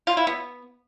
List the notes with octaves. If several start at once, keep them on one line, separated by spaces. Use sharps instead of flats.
F4
E4
B3